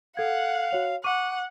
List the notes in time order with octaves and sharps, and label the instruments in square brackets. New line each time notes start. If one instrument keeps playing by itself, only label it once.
[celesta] A4 G#6 [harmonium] F5 [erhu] F#5
[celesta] F#4 C#5 F7
[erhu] F#5 [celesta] C#6 D6 D#7